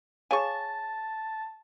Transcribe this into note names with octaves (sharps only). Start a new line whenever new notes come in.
G#4 C#5 F5 G#5 A5 C#6